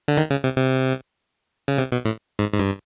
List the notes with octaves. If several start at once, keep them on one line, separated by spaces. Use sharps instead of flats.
D3
D#3
C#3
C3
C3
C#3
C3
B2
A2
G#2
G#2
G2